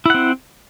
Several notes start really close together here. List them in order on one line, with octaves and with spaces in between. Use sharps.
E4 F#5 C4